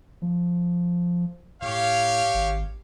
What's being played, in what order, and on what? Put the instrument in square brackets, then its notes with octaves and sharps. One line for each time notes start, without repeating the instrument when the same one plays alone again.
[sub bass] F3
[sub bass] A2 [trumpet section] G4 C#5 F5
[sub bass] G#1